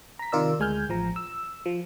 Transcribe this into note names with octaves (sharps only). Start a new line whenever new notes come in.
A#5 B6
C3 D#3 F4 A#4 D5 E6
D2 G#3 G#5 F6 G6
A1 F3 A#5
E6
F3